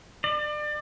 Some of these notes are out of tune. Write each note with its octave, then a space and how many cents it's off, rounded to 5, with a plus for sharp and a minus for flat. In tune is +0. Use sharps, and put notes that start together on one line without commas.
D5 +30